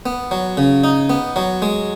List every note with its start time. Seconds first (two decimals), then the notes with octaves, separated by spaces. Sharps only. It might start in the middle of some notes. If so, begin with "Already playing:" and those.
0.06 B3
0.31 F#3
0.57 C#3
0.84 D#4
1.10 B3
1.36 F#3
1.62 G#3